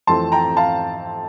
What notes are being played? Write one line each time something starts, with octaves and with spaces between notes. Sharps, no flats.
F2 E3 A3 C4 A5 C6
G5 A#5
F5 A5